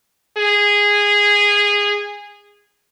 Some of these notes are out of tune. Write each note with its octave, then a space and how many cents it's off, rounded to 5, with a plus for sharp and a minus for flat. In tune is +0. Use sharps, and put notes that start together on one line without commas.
G#4 -15